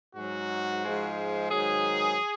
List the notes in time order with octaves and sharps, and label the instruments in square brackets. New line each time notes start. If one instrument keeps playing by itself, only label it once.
[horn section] G#2 F#3 F#4
G#2 F3 G#3
G#2 D#3 F#3 G#4